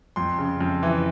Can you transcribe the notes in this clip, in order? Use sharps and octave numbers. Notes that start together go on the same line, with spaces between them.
F2 C6
C#3
F2
E3